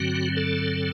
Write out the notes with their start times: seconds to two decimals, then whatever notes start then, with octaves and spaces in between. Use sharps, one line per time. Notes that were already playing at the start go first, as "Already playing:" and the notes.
Already playing: G2 D3 F#3 C4 F#4
0.37 A4